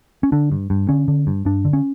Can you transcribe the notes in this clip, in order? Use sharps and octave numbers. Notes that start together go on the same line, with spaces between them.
C#4
D3 D4
G2
G2
D3 C#4
D3
G2
G2 D4
D3
C#4